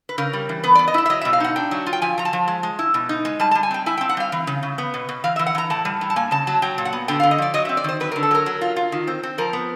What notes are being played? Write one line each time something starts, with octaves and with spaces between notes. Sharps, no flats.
B4
C#3 A#4
G3
E3
B3 B4
D5
B3
D#5
E4 E5
E5
F#3 D#5
E5
B2
F5
D#4 F#5
D4 G5
F#3
F4
G5
F3 G#5
F3 A#5
A5
F3
G#3
G#3
E4
B2
D#4
G#3
G3 A5
A5
G3
G#5
C4 G5
E4 G#5
G5
C4
F#5
G3 F5
E3
C#3
C#3
B3
B2
B2
E3 F5
E5
E3
F#5
E3 A#5
A2 A5
G3
A2
A5
A#3 G#5
C#3 A5
F#3 A5
F#3 G5
A#2
F#5
B3
D3 G5
F5
D3
D#5
F3 D5
F#3 D#5
E5
C4
D5
D#3 C5
F#3 B4
A#4
D3
A4
F#3 A#4
F#3
F4
F4
D#3
C4
C4
F3 A#4
B3